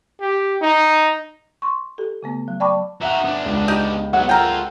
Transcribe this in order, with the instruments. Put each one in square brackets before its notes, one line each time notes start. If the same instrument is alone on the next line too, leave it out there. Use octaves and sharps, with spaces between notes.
[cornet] G4
D#4
[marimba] C6 C#6
G4 A4
C#3 A3 B3
F#3
D5 G5 A5 B5 C#6 D6
[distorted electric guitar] D#4 F#4 [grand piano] E5 F#5
[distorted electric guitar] B3 D4
[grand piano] C#2
[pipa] D#4 G4
[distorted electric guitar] F#3 B3 [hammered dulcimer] F#5
[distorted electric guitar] F4 A4 [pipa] A#4 G5